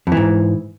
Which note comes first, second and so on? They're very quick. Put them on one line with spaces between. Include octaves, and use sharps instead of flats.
F2 E3 G#2